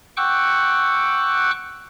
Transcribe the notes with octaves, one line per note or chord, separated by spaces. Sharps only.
F#5 G5 C#6 D6 E6 F#6